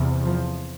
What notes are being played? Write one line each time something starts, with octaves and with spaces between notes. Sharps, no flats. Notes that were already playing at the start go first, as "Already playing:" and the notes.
Already playing: E2 C3
F3